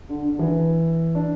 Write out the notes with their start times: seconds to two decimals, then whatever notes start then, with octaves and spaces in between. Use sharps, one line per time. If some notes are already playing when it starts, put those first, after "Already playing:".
0.09 D3
0.24 D3
0.35 D3
0.39 E3
1.15 D4